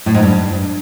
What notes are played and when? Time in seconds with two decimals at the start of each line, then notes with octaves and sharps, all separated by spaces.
0.06 A2
0.14 G#2
0.23 G2